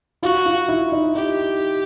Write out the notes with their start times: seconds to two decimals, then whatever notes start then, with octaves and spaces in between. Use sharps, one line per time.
0.23 F4 F#4
0.46 F4
0.69 E4
0.92 D#4
1.15 D#4 G4